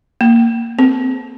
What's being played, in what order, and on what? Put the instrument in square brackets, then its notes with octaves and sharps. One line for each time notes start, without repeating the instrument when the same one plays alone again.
[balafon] A#3
C4